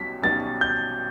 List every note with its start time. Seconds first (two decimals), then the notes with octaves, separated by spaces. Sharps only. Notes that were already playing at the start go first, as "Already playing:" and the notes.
Already playing: B1 B2 G3 C#4 B6
0.22 B1 B2 G3 C#4 F#4 A6
0.61 G6